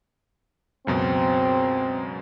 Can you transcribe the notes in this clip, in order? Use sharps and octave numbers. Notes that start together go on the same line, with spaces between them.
C#2 F#2 B2 C4